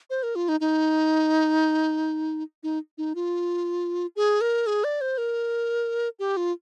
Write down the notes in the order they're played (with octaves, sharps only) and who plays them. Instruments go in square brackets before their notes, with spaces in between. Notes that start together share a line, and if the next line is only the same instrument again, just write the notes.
[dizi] C5
A#4
F4
D#4
D#4
D#4
D#4
F4
G#4
A#4
G#4
D5
C5
A#4
G4
F4